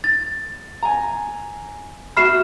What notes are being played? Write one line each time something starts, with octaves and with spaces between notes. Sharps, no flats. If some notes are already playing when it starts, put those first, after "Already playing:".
A6
G#5 A#5
F#4 E5 B5 F6 C7 E7